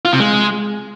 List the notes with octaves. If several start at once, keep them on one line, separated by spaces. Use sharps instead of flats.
F4
C3
G#3